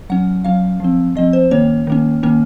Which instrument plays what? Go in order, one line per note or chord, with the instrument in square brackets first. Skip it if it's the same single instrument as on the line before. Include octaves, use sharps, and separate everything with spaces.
[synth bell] F#3 C#4 F#5
F#3 C#4 F5
F3 C4
F3 C4 D#5
C5
D#3 A#3 C#4 C#5
D#3 A#3 C#4
D#3 A#3 C#4